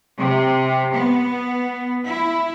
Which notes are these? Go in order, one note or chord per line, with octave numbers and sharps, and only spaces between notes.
C3
B3
E4